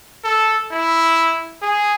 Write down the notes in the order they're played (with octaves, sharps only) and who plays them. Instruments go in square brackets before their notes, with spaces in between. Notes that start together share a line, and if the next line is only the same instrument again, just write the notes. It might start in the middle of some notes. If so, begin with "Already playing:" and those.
[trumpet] A4
E4
G#4